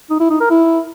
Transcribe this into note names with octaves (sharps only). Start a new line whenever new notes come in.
D#4
E4
D#4
A#4
E4